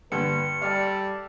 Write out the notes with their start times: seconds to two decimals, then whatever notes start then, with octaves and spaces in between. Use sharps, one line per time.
0.12 G2 D3 B4 C#7
0.61 G3 A4 D5 F5